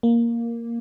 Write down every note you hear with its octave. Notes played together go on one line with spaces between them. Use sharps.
A#3